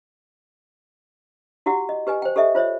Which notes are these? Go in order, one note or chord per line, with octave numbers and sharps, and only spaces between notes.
E4 F#4 G4 F#5
D#5
G4 B4 D#5 G#5
C5 G5
G4 A4 D#5 E5
F4 C5 C#5 E5